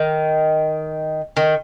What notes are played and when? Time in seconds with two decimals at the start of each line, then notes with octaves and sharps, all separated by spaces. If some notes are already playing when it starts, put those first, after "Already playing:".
Already playing: D#3
1.37 D#3